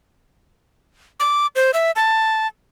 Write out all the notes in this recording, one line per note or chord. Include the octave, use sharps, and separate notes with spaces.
D6
C5
E5
A5